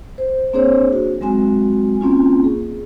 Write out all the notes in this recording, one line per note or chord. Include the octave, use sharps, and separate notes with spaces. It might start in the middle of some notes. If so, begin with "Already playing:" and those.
C5
A#3 C4 D4 G#4 C5 C#5
F#4
F#3 G#3 C4 F#4 G#5
A#3 C4 C#4 F4
G#4